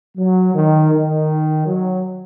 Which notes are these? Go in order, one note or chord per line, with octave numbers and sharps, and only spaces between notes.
F#3
D#3
D#3
F#3